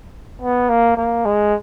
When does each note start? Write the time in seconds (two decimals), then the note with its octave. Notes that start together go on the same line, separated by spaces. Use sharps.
0.41 B3
0.69 A#3
0.97 A#3
1.25 G#3